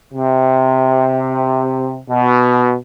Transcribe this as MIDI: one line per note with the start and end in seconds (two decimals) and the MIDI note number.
0.12 2.00 48
2.09 2.75 47